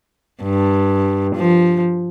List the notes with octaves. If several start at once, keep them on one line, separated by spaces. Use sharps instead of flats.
G2
F3